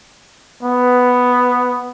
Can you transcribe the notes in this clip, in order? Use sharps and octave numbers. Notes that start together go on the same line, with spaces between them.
B3